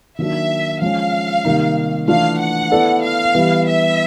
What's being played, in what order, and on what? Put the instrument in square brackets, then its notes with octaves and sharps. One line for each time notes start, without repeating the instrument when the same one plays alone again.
[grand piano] D#3 F#3 A#3 D4 [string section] E5
[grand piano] F3 G#3 C#4 [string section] F5
[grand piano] C3 D#3 G3 A#3 D#4
[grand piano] E3 A3 D4 F4 [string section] F5
[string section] F#5
[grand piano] B3 E4 A4 D5
[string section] F5
[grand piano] E3 G3 B3
[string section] E5